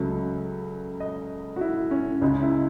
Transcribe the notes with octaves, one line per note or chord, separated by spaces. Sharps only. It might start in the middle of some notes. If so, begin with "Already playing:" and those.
Already playing: C#2 C#3 F#3 A3
D#5
F#4
E4
C#4
C#2 C#3 G#3 D#4
E4